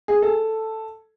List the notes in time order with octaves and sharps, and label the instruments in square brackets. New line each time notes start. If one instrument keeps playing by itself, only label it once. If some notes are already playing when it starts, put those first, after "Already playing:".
[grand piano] G#4
A4